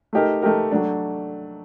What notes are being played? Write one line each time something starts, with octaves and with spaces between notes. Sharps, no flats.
A3 D#4 G4 A#4
A3 D#4 G4 A#4
F#3 A3 D4